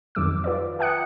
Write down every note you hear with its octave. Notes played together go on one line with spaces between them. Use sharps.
F2 D#3 F#3 D6 E6
F4 B4 D5
E5 F#5 G5 D#6 F#6 C#7